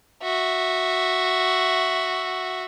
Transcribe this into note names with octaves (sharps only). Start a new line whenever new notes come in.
F#4 E5